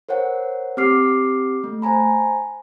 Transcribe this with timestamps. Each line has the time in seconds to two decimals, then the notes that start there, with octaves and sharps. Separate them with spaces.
0.09 A#4 C5 C#5 F#5
0.77 C4 G4 D6 F6 C7
1.64 A3
1.82 C5 G#5 A#5 B5